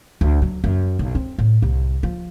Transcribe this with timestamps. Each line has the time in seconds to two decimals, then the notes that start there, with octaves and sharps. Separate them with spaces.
0.21 D2
0.42 F#3
0.64 F#2
0.99 B1
1.15 C4
1.38 A2
1.62 C2
2.03 F3